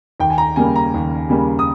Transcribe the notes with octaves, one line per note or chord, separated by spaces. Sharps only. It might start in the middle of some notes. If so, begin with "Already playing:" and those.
D#2 G5
G#5
A#5
C#3 G3 A#3 G#5
A#5
D#2
C#3 G3 A#3
D#6